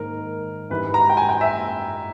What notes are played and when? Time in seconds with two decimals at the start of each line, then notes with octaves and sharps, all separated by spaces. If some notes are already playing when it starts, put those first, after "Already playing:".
Already playing: G#2 D#3 A#3 D#4 A#4
0.70 G#2 E3 G3 B4
0.94 A#5
1.09 G5
1.17 G#5
1.29 G5
1.41 E5